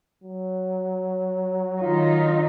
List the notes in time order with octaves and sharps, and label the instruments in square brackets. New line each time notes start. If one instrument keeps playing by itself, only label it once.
[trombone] F#3
[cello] D#3 D#4 [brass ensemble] F4